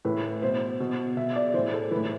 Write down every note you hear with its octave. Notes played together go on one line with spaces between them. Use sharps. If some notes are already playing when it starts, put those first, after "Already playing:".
A2 E3 B4
B2 C5
B2
B2 E5
D5
A2 E3 C5
A4
E3 B4
A2